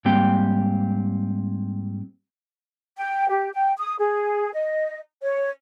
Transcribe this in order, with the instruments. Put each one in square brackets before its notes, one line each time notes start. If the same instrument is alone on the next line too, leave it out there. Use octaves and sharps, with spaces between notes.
[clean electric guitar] G#2 G3 A#3 C4 G4 G5
[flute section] G5
G4
G5
D#6
G#4
D#5
C#5